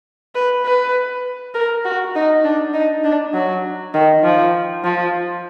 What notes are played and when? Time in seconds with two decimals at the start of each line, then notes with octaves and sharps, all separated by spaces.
0.35 B4
0.65 B4
1.54 A#4
1.84 F#4
2.15 D#4
2.44 D4
2.74 D#4
3.04 D4
3.34 F#3
3.94 D#3
4.24 F3
4.84 F3